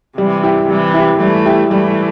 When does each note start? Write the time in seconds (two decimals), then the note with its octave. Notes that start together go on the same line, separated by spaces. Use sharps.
0.17 C3 E3 G3
0.43 E4 G4
0.69 C3 E3 G3
0.94 E4 G4
1.20 E3 G3 A3
1.46 E4 G4
1.71 E3 G3 A3